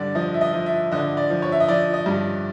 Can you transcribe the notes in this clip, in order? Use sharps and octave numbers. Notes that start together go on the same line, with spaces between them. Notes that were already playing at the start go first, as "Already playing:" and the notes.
Already playing: G2 D3 D5
F3 D#5
E5
D#5
F3
E5
D3 D#5
D5
F3
C#5
E5
D#5
F3 D5
D#5
G2